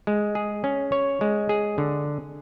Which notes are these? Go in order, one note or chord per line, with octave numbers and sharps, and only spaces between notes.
G#3
G#4
C#4
C#5
G#3
G#4
D3